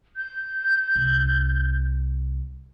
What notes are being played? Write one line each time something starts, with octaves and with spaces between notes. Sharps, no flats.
G6
C2